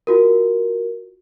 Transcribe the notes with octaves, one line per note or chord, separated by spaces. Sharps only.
F4 F#4 A#4